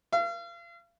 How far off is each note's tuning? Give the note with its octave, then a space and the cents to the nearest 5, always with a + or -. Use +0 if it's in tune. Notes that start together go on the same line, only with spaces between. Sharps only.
F5 -40